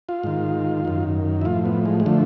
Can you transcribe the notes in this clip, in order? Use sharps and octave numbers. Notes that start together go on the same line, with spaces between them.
F4
G#2 D#3
F#2 D#3
E4
A2 F3 F4
B3
G#3
G#3
D3 F3 A3